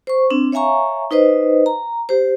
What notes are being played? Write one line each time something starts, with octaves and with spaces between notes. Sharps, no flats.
C5 C#6
C4 D4
C#5 E5 F5 G#5 A#5 C#6
D#4 B4 C5 D#5
A#5
G4 C5